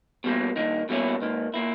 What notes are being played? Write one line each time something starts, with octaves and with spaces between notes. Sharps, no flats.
B2 G3 A#3
G2 D#3 A#3 D#4
B2 G3 A#3 C#4 E4
G#2 D#3 A#3
A#2 A#3 E4